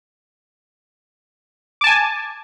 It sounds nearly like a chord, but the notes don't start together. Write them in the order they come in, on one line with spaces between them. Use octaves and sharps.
D6 A5 G#5